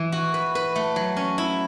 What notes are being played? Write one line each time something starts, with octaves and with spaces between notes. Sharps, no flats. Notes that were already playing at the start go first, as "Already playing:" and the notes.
Already playing: E3
F#4
B4
B4
A3
F#3
C#4
E4